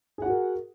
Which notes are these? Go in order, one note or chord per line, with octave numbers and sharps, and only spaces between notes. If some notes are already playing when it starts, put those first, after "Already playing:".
F#4 G#4 A#4 F#5